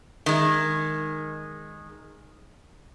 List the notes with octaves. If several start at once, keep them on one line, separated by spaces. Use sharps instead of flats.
D#3 G#3